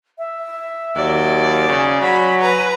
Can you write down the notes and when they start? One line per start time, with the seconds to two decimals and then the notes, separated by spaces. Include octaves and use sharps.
0.18 E5
0.96 D#2 F#3 D5
1.69 C#3 G#5
2.02 F#3 B5
2.42 B4 A#5